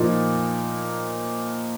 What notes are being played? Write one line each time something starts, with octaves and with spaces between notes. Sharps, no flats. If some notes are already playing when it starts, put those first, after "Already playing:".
Already playing: A#2 F3 A#3 D#4